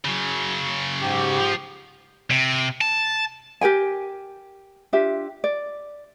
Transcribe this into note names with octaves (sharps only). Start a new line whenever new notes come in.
C#3 F#3
G#2 G4
F3
C3
A5
G4 A#4 G5 G#5
D4 F4 G4 E5
D5